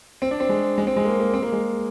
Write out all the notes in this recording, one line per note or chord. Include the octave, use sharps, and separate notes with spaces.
C4
D4
C4
G#3
G#3
C4
G#3
A#3
A#3
C4
A#3
G#3